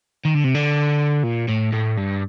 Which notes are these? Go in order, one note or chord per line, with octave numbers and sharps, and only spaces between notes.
D#3
D3
C3
D3
A#2
A2
A2
G2